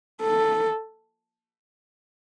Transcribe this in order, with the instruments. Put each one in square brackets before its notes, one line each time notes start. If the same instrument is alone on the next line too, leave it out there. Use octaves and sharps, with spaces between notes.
[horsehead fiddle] A4